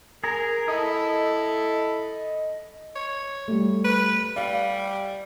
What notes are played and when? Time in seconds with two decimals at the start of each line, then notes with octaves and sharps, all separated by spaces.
0.24 G#4 A#4 A#5
0.68 E4 A4 D#5 D#6
2.96 C#5
3.48 G3 A3
3.85 B4
4.36 G3 F5